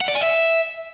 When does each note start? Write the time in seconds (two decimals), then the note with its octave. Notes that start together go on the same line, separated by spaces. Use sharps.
0.01 F#5
0.08 D5
0.15 G#5
0.22 E5